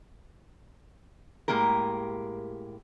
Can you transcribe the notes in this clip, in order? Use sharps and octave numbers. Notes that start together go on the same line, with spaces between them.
A2 E3 G#3 A#3 G4 A#4